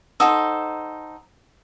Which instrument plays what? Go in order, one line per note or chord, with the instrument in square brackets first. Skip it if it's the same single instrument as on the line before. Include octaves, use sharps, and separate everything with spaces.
[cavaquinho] D#4 A4 C5 [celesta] F#5 D#6 E6